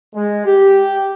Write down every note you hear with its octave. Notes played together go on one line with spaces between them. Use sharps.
G#3
G4